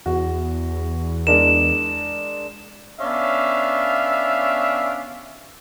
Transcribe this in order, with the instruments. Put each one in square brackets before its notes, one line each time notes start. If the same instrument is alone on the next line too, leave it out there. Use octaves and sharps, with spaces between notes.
[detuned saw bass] E2 [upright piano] F#4
[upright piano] G#3 D4 A#4 [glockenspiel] E7
[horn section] B3 C#4 D4 E5 F5